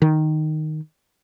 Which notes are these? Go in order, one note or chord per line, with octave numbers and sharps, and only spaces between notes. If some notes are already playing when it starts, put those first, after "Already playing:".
D#3